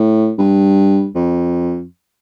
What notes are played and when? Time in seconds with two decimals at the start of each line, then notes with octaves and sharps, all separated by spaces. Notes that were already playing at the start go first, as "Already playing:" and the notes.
Already playing: A2
0.39 G2
1.15 F2